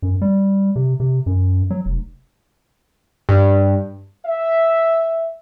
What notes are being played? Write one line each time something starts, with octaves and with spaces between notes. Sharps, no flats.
F#2
G3
C3
C3
F#2
F#3
F1
G2
E5